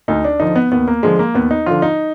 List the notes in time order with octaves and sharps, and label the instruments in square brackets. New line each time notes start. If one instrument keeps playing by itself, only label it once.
[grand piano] D2 D#4
D4
D3 F3 D#4
B3
D#2 B3
A#3
D3 F3 G#3
A#3
D#2 B3
D#4
D3 F3 F4
D#4